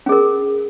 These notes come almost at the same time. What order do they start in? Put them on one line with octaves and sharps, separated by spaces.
C#4 G#4 A#4